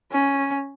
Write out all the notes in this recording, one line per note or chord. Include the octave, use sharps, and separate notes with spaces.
C#4